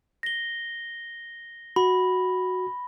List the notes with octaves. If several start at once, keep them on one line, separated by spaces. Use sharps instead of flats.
A#6 G7
F#4 B5